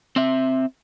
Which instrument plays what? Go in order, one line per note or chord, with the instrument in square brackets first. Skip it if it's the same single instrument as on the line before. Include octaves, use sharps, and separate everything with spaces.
[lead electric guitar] C4 E5